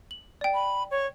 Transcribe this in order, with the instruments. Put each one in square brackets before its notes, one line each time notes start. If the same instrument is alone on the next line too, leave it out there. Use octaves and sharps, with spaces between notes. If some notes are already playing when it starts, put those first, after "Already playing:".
[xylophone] F#7
D5 G5
[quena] B5
C#5